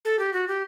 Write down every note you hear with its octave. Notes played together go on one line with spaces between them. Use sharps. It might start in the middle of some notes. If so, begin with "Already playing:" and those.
A4
G4
F#4
G4